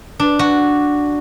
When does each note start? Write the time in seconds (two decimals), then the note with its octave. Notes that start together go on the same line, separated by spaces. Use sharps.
0.20 D4
0.39 F#4